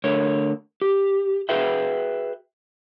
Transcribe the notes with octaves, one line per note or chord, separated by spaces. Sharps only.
D3 A3 A#4 C#5
G4
F#4 G#4 B4 E5 G5